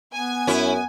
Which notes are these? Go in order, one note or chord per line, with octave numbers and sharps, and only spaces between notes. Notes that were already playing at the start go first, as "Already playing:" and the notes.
B3 G#5
F#2 C#4 E4